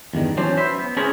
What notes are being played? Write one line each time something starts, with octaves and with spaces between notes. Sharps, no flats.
E2 G2 D#3
E3 F#3 C#4 D4 C5
B4 C5 E5
B3
C#4 E4 G#4 A#4 C5 C#5